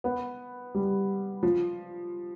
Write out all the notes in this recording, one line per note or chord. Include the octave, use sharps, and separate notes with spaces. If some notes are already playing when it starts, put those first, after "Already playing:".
B3
G3
F3